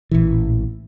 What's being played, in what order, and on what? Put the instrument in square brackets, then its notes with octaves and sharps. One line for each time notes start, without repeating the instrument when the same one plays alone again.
[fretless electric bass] A1 A#2 E3